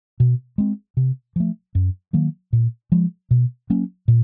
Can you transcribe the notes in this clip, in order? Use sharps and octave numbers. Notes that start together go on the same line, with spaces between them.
B2
G#3 C4
C3
F3 A3
F#2
D#3 F#3 A#3
A#2
F3 G#3
B2
F#3 A#3 C#4
A#2